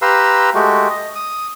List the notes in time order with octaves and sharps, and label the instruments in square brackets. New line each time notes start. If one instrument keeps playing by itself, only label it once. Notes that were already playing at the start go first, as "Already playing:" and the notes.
[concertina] G4 B4 F5 A#5 C6 E6
G#3 A3 F#4 G4
D#5
D#6